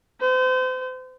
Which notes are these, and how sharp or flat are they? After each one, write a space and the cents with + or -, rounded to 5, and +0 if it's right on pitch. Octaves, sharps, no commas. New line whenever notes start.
C5 -35